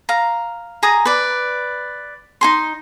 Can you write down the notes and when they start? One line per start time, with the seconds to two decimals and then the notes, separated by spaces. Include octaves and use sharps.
0.09 F5 A#5
0.83 G#4 A#5 D#6
1.05 B4 D5
2.41 D#4 G#4 C6